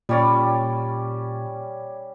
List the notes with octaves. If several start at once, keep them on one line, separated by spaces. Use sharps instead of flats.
A#2 G3 C#4 D5